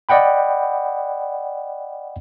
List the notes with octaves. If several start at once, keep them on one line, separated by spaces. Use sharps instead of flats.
D5 D#5 F#5 G5 B5